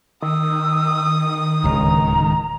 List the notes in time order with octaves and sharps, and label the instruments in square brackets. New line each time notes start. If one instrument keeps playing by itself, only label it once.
[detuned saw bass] D#3 [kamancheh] D#6 [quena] E6
[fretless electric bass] D1 C#2 [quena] A#5